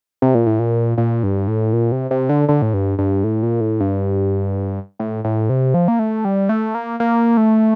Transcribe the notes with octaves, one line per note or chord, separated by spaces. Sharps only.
C3
A#2
A2
A#2
A#2
G2
A2
A#2
C3
C3
D3
D3
A2
G2
G2
A2
A#2
A2
G2
A2
A2
C3
F3
A#3
A3
G3
A3
A#3
A#3
A3